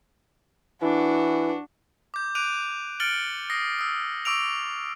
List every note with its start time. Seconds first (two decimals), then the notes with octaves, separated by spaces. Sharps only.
0.82 E3 D4 F#4
2.14 D6 G6
2.35 D6 F#6 D7 D#7 F7
3.00 F6 A6 C#7 D7 F#7 G7
3.50 D#6 A#6 C7
3.79 D#6 E6
4.25 C#6 D6 E6 D7 F7